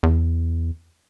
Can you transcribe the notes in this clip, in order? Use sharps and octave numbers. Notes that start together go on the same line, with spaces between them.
E2